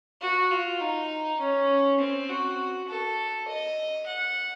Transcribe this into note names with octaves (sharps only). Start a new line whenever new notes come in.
F#4
F4
D#4
C#4
C4
F#4
A4
D#5
F#5